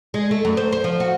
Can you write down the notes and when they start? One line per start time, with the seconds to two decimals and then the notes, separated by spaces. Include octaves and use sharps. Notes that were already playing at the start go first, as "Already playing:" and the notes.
0.14 G#3
0.31 A3
0.45 F#2
0.57 C5
0.72 C5
0.84 F3
1.00 F#4